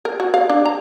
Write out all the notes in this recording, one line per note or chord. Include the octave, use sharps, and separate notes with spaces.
A#4
F#4
F5
D4
A#5